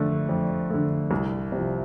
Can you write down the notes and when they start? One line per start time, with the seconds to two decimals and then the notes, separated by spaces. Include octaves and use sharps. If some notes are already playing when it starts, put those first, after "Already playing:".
Already playing: F2 D3 A3
0.29 F2
0.70 D3 A3
1.11 C2
1.52 C3
1.57 F3